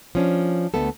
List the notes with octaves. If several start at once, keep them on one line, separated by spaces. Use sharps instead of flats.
F3 C#4 D4
D2 A3 B3 A4